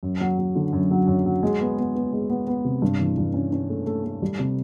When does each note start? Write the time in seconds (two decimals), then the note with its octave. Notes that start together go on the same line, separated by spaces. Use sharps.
0.03 F#2
0.21 F#3
0.39 F#3
0.55 D3
0.73 F#2
0.91 F#3
1.07 F#2
1.26 F#3
1.43 G#3
1.61 B3
1.78 B3
1.95 B3
2.13 G#3
2.30 B3
2.48 B3
2.64 C3
2.82 G2
2.99 E3
3.18 G2
3.34 C#4
3.53 C#4
3.70 A3
3.86 A3
4.04 A3
4.22 G3
4.39 C3